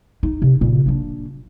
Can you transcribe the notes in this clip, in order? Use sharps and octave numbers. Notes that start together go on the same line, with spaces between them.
D#4
C3
A#2 C#3
A#3 D4